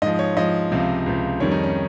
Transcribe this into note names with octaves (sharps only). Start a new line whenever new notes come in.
G#2 F3 D#5
C#5
G#2 F3 D#5
C#2 C3 F3
C#2 C3 F3
F2 D#3 G3 C#5
D#4
C#4